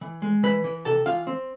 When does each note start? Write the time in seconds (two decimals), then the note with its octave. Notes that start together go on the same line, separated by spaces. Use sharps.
0.01 E3
0.22 G#3
0.43 E3 B4 B5
0.64 E3
0.85 C3 A4 A5
1.06 E3 F4 F5
1.27 C4